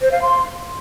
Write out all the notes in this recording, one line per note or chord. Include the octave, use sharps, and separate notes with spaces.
C5
F5
C6